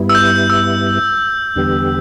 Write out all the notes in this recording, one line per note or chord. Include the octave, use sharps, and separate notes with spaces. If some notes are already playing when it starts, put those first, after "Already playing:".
Already playing: G2 G3 B3 E4
E6
G6
E6
E2 D3 G3 B3 G4